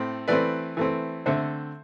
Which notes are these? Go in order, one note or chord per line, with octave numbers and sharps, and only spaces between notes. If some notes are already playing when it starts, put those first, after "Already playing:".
Already playing: A2 A3 C4
E3 A3 C4 B4 D5
E3 A3 C4
D3 A3 C4 C5 E5